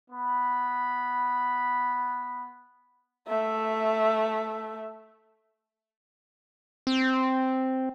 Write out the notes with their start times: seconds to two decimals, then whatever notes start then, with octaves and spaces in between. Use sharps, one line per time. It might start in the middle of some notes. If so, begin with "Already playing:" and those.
0.11 B3 B5
3.28 A3 E5
6.87 C4